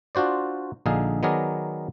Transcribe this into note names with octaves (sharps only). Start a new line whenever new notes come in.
D4 F4 F#4 C5 D5
A#1 D3 D#4 G#4 F5
D#3 F#3 B3 G#4 A#4 D5